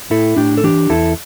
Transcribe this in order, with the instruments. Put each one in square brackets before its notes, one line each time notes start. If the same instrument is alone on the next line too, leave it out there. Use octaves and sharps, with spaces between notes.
[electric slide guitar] A2 E4 A4
A2 D4 G4
A4
E3 D4 G4
E2 E4 A4